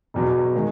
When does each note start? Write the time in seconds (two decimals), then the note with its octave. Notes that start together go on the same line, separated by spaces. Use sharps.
0.14 E1 E2 B2 F#3
0.56 D#3 G#3